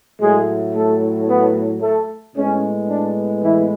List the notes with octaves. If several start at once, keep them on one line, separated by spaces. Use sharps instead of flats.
A2 F#3 G#3 A3 G#4
A3 A4
B3 B4
A3 A4
A2 G#3 B3 C#4
D4
E3 E4